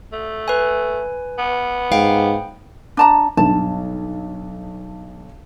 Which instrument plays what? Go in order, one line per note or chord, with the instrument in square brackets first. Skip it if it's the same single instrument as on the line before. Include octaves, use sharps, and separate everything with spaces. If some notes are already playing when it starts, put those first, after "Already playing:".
[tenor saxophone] A3
[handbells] B4 G#5
[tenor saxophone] B3
[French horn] G#2 [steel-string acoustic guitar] F5 [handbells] G5
[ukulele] D4 A5 A#5
[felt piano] B1 G2 [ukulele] A5